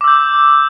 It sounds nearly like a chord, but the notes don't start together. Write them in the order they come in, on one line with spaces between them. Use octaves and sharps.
D6 E6 G6